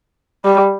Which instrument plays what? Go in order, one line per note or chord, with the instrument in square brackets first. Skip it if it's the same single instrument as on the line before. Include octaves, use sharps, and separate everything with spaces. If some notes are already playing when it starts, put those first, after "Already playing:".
[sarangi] G3